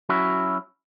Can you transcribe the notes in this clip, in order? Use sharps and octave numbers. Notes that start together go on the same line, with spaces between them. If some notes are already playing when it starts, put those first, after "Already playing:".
F#3 C#4 E4 F#4